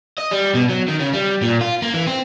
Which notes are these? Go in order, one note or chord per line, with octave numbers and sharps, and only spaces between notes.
D#5
G3
B2
F#3
D#3
C#3
G3
A#2
F4
A#3
E3
C4